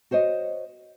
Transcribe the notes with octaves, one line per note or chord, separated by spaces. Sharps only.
F#4 C5 C#5 D#5